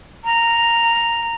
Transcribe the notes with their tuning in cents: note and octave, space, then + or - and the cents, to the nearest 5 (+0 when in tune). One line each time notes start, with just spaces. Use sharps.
A#5 -5